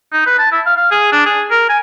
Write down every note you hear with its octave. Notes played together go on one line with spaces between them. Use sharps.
D#4
B4
A5
E4
F5
F5
G#4
D4
G#4
A#4
G#5